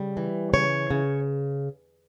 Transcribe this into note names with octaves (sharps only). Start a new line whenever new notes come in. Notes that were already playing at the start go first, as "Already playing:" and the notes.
Already playing: C#3 G3
E3
C#3 C#5
C#3